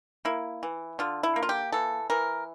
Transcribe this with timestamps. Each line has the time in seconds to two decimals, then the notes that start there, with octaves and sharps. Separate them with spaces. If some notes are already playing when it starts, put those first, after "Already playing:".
0.25 A#3 E4
0.63 E3
0.99 D3 F4
1.23 E4
1.36 A#3
1.43 F4
1.49 G4
1.72 E3 A4
2.10 E3 A#4